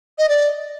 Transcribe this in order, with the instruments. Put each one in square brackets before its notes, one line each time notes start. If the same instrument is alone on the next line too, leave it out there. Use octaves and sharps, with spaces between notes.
[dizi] D#5
D5